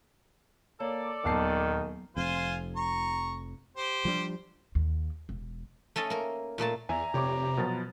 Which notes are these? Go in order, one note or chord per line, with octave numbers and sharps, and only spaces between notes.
A#3 A4 C#5 D5
D#1 D#3 F#3 B3 A5 C7
F1 F2 F4 C5 G#5
A#5 C#6
G4 C5
F3 G3 D4
D#2
E1
A3 C#4 A4 D#5
A#3 A#4
A#2 A3 A#3 A5
E2 D5 E5 G#5 A#5
F1 C3 G4 C#5 D6
B2 F3 F#3 B3 B4 A6